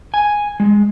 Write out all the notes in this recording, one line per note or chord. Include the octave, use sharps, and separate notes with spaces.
G#5
G#3